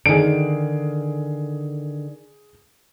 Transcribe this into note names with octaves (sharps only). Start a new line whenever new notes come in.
D3 D#3 G#4 D7